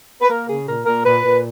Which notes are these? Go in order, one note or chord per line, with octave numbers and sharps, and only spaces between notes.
B4
A#3 A#4
C#3 G#4
A#2 A#4
A#2 A#4
A#2 B4
A#2